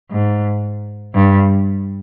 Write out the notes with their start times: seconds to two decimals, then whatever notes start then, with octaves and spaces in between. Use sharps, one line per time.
0.11 G#2
1.15 G2